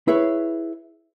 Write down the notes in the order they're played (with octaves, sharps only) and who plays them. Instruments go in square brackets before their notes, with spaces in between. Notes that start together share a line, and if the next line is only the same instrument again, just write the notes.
[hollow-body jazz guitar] E4 G#4 B4 C#5